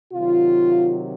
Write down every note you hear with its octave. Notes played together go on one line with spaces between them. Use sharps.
C3 D#3 F#3 F4